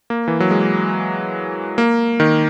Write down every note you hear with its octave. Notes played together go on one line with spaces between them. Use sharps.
A#3
E3
F#3
G#3
A#3
D#3